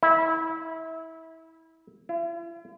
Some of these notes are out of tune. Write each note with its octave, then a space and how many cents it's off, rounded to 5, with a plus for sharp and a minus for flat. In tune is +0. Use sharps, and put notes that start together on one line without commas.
E4 -25
E4 +45